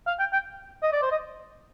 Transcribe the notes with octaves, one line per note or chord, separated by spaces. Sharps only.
F5
G5
G5
D#5
D5
C5
D#5